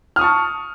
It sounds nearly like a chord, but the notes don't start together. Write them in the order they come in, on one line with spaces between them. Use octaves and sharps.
F6 D#6 C#6 A5